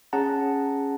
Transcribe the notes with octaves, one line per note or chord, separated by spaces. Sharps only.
C#4 G#4 F#5 A5 A#5